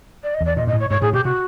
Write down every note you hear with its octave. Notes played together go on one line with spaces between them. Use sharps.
D5
D#5
E2
D5
A#2 D#5
G#2 D#5
A2
C#5
G#2 C#5
A2 G#4
B2 G4
C3 F#4